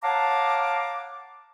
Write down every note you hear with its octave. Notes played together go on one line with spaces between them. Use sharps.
C#5 F5 F#5 A5 A#5 D6